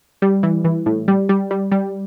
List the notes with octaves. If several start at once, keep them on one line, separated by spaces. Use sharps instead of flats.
G3
E3
E3
A2
G3
G3
G3
G3